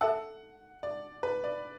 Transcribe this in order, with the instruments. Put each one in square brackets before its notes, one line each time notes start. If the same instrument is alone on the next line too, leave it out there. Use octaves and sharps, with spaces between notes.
[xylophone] A4 E5 A5 E6 [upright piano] F#5
[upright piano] D5
B4
D5